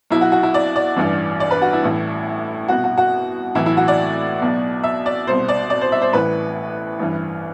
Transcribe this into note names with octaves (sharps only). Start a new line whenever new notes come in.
B1 B2 E4
F#4
F#4
E4
D5
D5
A1 G2 E3
D5
B4
F#4
E4
A1 A2 E3
C2 B2 F#4
F#4
F#4
B1 A2 E3 E4
E4
F#4
D5
B1 B2
E5
D5
C2 B2 C5
D5
D5
C5
E5
C5
A1 A2 E3 B4
A1 G2 E3